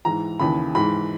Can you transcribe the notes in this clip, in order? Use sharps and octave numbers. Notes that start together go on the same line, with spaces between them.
G#2 E3 A#5
D#2 C#3 E3 B5
G#2 E3 B5